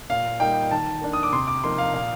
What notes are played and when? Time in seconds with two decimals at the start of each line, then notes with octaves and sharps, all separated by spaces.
0.10 A#2 F5
0.40 G3 A#3 D#4 G5
0.71 D#3 A5
1.02 A#3 D4
1.13 D#6
1.23 D6
1.32 C3 C6
1.47 D6
1.64 F3 A#3 D#4 C6
1.78 F5
1.93 A#2 F5